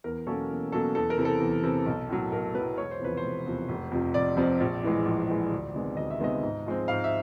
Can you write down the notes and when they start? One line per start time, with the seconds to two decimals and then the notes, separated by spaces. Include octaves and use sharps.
0.04 E2 A#4
0.27 B2 F#3 A#3 C#4 A4
0.50 E2
0.72 B2 F#3 A#3 C#4 A4
0.95 E2 A4
1.10 A#4
1.18 C3 E3
1.25 A4
1.40 E2
1.63 C3 E3
1.86 B1
2.09 A2 F#3
2.32 B1 A#4
2.54 A2 F#3 B4
2.78 E1 C#5
2.91 C5
3.00 E2 C3 F3 B4
3.17 C5
3.24 E1
3.46 E2 C3 F3
3.69 F1
3.92 F2 C3 F3
4.14 F1 D5
4.37 F2 C3 F3
4.60 A#1
4.83 A2 E3 G#3
5.05 A#1
5.29 A2 E3 G#3
5.52 D2
5.74 C3 D#3 G#3 B3
5.97 D2 D#5
6.11 E5
6.20 C3 D#3 G#3 B3 D#5
6.43 G#2
6.66 F3 G#3 C4
6.88 G#2 F5
7.04 E5